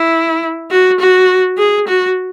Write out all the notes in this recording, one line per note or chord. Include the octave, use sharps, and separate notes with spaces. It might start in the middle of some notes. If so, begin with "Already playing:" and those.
Already playing: E4
F#4
F#4
G#4
F#4